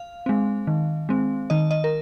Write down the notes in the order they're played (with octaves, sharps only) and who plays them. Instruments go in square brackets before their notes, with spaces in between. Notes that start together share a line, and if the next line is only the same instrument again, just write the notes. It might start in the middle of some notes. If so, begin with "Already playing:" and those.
Already playing: [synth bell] F5
G#3 C4
D#3
G#3 C4
D#3 D#5
D#5
A#4